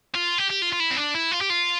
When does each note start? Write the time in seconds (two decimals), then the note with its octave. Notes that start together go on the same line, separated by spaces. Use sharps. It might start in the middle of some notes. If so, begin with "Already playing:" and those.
0.15 F4
0.38 G4
0.50 G4
0.62 F4
0.73 F4
0.80 E4
0.91 C4
0.97 D4
1.15 E4
1.32 F4
1.41 G4
1.50 F4